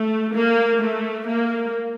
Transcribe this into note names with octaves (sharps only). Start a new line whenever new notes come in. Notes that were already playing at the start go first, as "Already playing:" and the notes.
Already playing: A3
A#3
A3
A#3